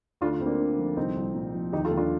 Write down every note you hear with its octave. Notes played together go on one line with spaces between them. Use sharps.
D2 D4 F4
D2 C4
A#3 D4
D3
F3
C2 C4 D#4
C2
A#2
F3
D#2 D#4 G4
F4 A4
D#2
D4 F4